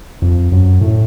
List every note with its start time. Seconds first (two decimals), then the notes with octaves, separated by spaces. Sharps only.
0.22 F2
0.52 F#2
0.82 A2